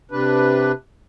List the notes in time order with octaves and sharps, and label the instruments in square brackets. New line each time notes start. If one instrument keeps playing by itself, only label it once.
[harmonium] C3 D4 B4